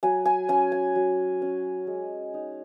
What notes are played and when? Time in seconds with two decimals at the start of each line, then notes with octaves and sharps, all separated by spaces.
0.03 F#3 G#5
0.25 G#5
0.49 C#4 G#5
0.72 G#5
0.96 F#3
1.42 C#4
1.87 G#3
2.34 D#4